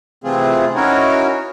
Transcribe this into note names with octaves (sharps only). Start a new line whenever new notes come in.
C3 E3 A3 C4 F4 G#4
C#4 D#4 E4 F#4 A#4 C#5